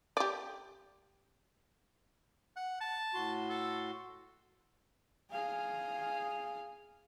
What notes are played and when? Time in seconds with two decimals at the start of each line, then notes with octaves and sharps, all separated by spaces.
0.17 G4 D5
2.56 F#5
2.81 A5
3.14 A2 F#4 C6
3.50 A4
5.31 G#4 F5